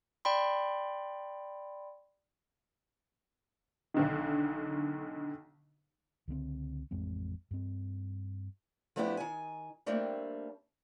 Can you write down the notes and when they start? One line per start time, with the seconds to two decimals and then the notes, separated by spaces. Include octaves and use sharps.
0.25 D5 G5 B5 C6
3.94 B1 D3 D#3
6.28 C#2 D3 A3 C4
6.91 A1 F2 G#3 C4
7.51 G2 C4
8.96 F3 A3 B3 D4 E4 G4
9.17 D#3 G#5
9.86 G3 A3 A#3 C4 D4